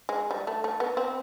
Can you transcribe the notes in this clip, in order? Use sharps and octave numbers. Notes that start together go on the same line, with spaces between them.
G#3
G3
A3
A3
B3
C4